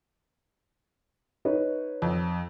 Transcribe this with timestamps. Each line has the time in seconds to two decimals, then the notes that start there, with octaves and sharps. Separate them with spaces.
1.45 D#4 B4 C#5
2.02 F2